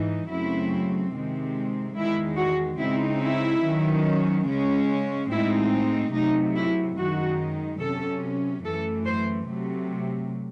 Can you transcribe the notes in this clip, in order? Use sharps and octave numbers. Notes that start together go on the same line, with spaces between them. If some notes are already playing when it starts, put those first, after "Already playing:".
Already playing: G#2 E3 D#4
F#2 C#3 F#3 A3 C4 E4
C3 D#3 G#3 C4
E2 D#3 G#3 E4
F#4
C#3 G#3 C4 D#4 E4
E4
D#3 F#3 C#4
C#3 G#3 C#4
A2 G#3 C4 D#4 E4
C3 F#3 A3 D#4
E4
F#2 D#3 G#3 D#4 F#4
C3 F#3 C#4 A4
F#2 E3 A3 A4
C5
C3 F#3 A3